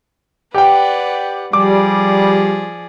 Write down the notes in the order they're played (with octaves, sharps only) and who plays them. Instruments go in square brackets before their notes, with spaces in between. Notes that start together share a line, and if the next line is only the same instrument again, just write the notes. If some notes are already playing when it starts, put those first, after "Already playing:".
[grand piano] G4 G5 [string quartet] B4 D5 F#5
[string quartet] F3 G#4 D5 [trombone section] G3 [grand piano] D6